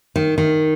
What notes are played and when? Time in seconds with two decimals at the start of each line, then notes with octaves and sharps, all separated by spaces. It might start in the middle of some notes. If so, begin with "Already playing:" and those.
0.16 D#3
0.38 D#3